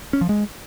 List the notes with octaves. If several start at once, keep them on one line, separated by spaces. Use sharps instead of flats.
C#4
F3
G#3